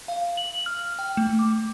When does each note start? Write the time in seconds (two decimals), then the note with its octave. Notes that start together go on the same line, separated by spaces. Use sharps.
0.08 F5
0.37 F#7
0.66 F6
0.99 G5
1.17 A3
1.39 D6